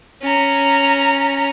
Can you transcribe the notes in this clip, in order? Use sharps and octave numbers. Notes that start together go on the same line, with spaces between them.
C#4 A#5